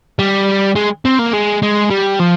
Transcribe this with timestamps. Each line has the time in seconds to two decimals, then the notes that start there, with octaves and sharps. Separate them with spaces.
0.19 G3
0.76 G#3
1.05 C4
1.19 A#3
1.33 G#3
1.63 G#3
1.90 G3
2.20 F3